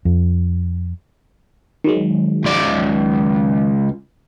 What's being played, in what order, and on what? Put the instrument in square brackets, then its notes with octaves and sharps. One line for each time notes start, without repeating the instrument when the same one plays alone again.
[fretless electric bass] F2
[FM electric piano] D#3 F#3 G#3
[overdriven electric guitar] C#2 D5